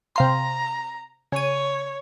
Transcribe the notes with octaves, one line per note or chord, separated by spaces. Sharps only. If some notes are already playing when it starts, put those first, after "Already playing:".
C3 F5 A#5 C6
C#3 C#5 D#7